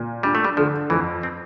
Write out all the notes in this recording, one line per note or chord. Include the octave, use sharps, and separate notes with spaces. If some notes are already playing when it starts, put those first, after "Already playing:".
Already playing: A#2
G3 D4
A3
G3
D3 F3
F2 E3
C4